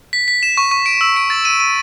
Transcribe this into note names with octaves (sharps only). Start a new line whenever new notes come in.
B6
B6
E7
C#6
C#6
D7
E6
D7
A6
D#7
D#7